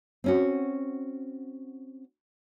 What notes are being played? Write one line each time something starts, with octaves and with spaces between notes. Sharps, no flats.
C4 C#4 F#4